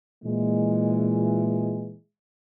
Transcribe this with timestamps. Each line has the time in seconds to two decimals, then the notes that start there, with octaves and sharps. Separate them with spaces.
0.24 A#2 E3 G#3